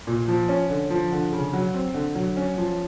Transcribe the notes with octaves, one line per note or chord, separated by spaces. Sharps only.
A#2
F3
C#4
D3
F3
D3
C#3
F#3
C4
D3
F#3
C#4
F3